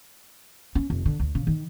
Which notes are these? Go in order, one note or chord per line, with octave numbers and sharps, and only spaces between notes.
C#4
F1
D3
D2
C#3
D#3